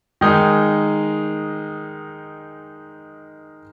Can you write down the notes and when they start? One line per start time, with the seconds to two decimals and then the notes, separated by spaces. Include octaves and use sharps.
0.21 D#3 G#3 D#4